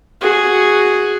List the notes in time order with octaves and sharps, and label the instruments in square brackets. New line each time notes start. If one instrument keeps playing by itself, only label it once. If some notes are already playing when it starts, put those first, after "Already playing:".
[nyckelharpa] F#4 G#4